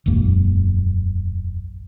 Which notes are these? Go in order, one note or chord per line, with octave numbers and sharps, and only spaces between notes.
E1 A#1 F#2 A#3